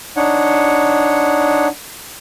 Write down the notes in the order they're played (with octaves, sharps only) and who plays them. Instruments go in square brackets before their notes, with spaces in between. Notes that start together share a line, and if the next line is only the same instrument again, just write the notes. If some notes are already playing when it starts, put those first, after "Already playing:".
[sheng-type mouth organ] D4 D#4 C#5 F#5